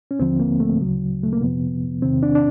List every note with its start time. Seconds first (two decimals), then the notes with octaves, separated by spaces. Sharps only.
0.11 C#4
0.20 D#2 D3 F3 C4
0.40 A#3
0.60 A3
0.80 D2 C#3 F#3
1.24 A3
1.33 A#3
1.41 F2 C3 F3 B3
2.02 E2 C3 D#3 C4
2.23 D4
2.35 D4